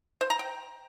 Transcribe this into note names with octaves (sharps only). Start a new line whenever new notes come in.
C5
A#5
G5